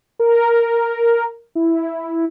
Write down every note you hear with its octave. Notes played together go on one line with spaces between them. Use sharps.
A#4
E4